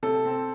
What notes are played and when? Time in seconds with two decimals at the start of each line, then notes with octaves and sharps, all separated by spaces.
0.03 C3 A4
0.25 C4